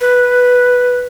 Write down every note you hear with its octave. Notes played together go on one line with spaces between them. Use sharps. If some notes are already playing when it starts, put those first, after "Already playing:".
B4